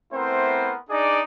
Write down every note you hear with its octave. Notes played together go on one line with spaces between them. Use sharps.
A3 B3 C4 E4 A#4 C5
D4 D#4 G#4 D5